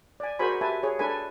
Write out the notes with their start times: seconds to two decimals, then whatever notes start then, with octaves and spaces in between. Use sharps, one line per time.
0.20 D5 G#5
0.39 F#4 G#4 A#4 C5 G#5 B5
0.61 G4 B4 E5 G#5 A5
0.83 G#4 C#5
0.99 D4 A4 B4 G#5